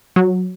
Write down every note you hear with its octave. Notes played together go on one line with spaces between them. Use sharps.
F#3